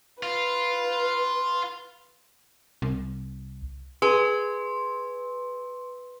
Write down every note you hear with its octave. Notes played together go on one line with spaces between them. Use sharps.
F4 B4
C2
G#4 B4 C6